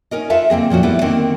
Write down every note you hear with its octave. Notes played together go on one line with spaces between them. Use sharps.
C#4 D#4 A#4 D#5
F4 A4 B4 E5 F5 A5
D3 A#3 C4 G#4
A#2 F3 C#4 F#4
G3 A3 B3 E4 B4
D3 D#3 A#3 C4 F#5